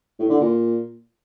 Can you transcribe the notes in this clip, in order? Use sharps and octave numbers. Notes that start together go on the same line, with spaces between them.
A2
D3
A#2